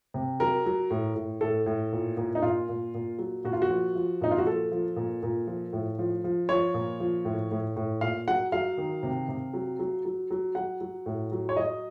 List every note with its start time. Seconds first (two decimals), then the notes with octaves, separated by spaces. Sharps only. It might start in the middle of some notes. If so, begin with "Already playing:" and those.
0.14 C3
0.40 F#3 A#4
0.66 F#3
0.90 A2
1.15 A2
1.41 A2 A4
1.66 A2
1.92 A#2
2.17 A#2
2.35 D#4
2.42 A#2 F4
2.69 A#2
2.94 A#2
3.19 F#3
3.44 A#2 F#4
3.53 F4
3.62 F#4
3.70 F3
3.95 F3
4.21 A#2 D#4
4.31 F4
4.38 F#4
4.47 F3 A4
4.71 F3
4.96 A#2
5.23 A#2
5.47 F3
5.73 A2
5.99 F3
6.24 F3
6.49 F3 C#5
6.74 A#2
7.00 F3
7.25 A2
7.51 A2
7.76 A2
8.01 A#2 F5
8.27 F#3 F#5
8.52 F#3 F5
8.78 D#3
9.03 C3
9.28 C3
9.54 F#3
9.79 F#3
10.05 F#3
10.31 F#3
10.55 F#3 F#5
10.81 F#3
11.06 A2
11.32 F#3
11.49 C#5
11.56 F#3 D#5